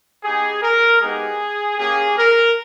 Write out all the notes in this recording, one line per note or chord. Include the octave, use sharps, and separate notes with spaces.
B3 D#4 G4 G#4
A#4
G#3 B3 D#4 G4 G#4
A#3 C#4 G4 G#4
A#4